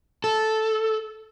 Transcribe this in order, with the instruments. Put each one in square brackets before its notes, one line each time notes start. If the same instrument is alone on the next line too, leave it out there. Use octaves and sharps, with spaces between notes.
[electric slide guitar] A4